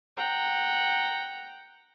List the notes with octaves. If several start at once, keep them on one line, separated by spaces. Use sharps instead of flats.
F#5 G5 A#5